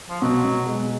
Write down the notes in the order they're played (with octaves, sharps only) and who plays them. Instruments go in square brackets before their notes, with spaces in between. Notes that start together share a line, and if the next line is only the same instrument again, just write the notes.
[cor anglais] F3
[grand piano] B2 [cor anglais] F#3
[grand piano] B2
G#3